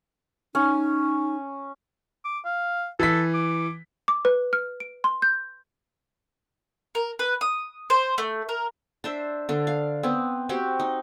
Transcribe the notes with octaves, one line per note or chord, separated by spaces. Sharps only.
C#4 D#4
D6
F5
E3 A4 B6
D6
D6
B4
F6
D7
C6
G6
A#4
B4
D#6
C5
A3
A#4
D4 C5 E5
D3 D4
F5
B3 C4
C4 F#4 G4
D#4